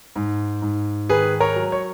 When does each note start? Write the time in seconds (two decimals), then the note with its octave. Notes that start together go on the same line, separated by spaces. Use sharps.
0.16 G#2
0.62 G#2
1.09 D#3 G#4 B4
1.40 A#4 C#5
1.56 F#3
1.72 C#5